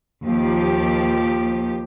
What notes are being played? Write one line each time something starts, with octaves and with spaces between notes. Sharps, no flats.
D#2 F3 G4